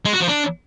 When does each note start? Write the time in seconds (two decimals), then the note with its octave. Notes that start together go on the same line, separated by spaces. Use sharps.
0.05 G#3
0.13 F#4
0.21 F3
0.28 D4